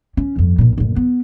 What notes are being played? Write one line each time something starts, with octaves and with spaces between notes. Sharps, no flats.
C#4
G1 F2
B1 A#2
F#1 A2
B3